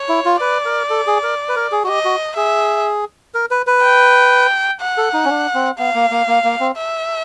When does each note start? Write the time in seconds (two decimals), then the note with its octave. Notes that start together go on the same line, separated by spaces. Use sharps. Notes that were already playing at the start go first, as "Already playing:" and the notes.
Already playing: C#5
0.09 E4
0.25 F4
0.41 B4 D5
0.66 A#4
0.90 A4
1.07 G#4
1.23 A#4
1.49 B4
1.56 A#4
1.72 G#4
1.84 F#4
1.88 G4 D#5
2.05 F#4
2.36 G#4 E5
3.34 A#4
3.51 B4
3.67 B4
3.83 G5
4.81 F#5
4.97 A4
5.14 D#4
5.25 C#4
5.30 D4
5.54 C4
5.78 B3 F5
5.95 A#3
6.11 A#3
6.28 A#3
6.44 A#3
6.60 C4
6.77 E5